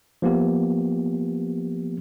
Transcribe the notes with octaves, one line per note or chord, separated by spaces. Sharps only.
F3 A#3 B3 G4